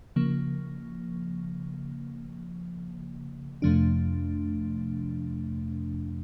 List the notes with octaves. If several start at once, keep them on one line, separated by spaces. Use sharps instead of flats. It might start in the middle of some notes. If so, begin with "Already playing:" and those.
C#3 F3 A#3
F2 C3 F3 A3 D4